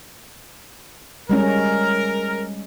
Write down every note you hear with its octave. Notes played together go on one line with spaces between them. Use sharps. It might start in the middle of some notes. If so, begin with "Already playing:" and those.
G3 G#3 C#4 A#4